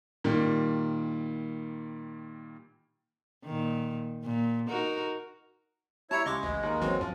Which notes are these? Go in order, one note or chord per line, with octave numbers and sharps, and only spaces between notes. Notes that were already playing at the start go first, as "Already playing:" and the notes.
A#2 D#3 G3
A#2 D#3
A#2
D#4 F#4 A#4
G3 E4 C#5 A5 A#5 C#7
C#2 G#3 D#5 C#6 D6
A1 D2
D#2 A#4
A1 E3 F#3 C4 F#4
F#2 F3